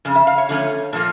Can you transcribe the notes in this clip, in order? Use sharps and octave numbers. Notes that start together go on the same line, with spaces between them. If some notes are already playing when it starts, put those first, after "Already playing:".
F2 C#3
E5
F5
C#5
D3 F3 A3 C#4
A#2 F3 A#3 A4